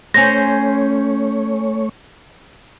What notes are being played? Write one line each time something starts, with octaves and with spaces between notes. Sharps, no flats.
A3 C#4 C5 C#5 A#6